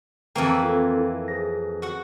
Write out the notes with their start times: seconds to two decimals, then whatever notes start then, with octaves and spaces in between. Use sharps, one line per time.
0.35 F2 E3 A#3 G5 C#6
0.63 C4 F4 A4
0.97 E4
1.28 G#4 C5 A#6
1.82 F#4 F#5